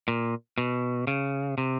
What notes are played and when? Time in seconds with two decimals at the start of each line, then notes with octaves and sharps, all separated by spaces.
0.08 A#2
0.58 B2
1.07 C#3
1.58 C3